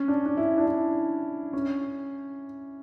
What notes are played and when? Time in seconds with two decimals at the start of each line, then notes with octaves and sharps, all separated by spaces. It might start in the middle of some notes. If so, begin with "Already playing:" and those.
Already playing: C#4
0.08 D4
0.26 D4
0.37 E4
0.58 D4
0.66 E4
1.53 C#4